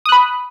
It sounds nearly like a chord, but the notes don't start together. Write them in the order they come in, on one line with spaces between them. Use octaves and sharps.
D#6 F#6 B5